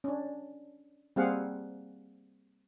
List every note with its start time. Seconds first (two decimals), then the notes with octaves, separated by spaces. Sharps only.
0.04 C#4 D4
1.16 G3 A#3 C4 G#4 F5 F#5